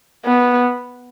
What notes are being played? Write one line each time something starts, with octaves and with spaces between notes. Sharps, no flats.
B3